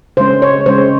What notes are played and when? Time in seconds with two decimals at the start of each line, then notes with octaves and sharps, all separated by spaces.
0.17 C#3 G#3 C#4 C5
0.42 C#5
0.66 C#3 G#3 C#4 C5